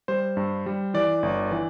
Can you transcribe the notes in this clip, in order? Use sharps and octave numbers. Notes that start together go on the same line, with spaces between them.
G3 C5
G2
G3
E3 D5
G1
E3